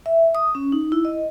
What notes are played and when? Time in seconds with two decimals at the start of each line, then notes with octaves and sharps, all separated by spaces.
0.06 E5
0.35 D#6
0.55 C#4
0.72 D#4
0.92 E4
1.05 D#5